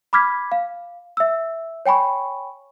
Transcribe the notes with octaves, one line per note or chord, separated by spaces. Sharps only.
B5 D6 F6 G#6 B6
F5
E5 E6
C#5 G5 G#5 B5 C#6